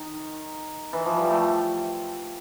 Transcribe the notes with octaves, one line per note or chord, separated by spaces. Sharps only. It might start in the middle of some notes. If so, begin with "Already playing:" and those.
Already playing: D#3
E3
F3
G3
A3